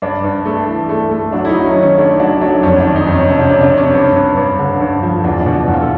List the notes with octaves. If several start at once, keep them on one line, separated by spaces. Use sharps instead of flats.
G2 D4
G2
A3
E3
A3
A3
F#3 D4
E4
D#4
F#3
C#4
D#3
C#4
A3 D4
F#3 D4
F#3 D4
F2 C#4
D4
D#3
D#4
F2 C#4
C3 C#4
D4
C#4
C3
D4
C3
C#4
G2 C#4
G2
G2
D3
G2
F3
E2 D4
D4
B2
E2
F4
A4